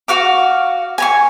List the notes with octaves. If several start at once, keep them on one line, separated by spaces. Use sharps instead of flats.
F#4 F5 D6
G#5 A#5 C#6